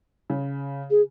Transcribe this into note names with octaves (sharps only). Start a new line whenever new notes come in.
C#3
G#4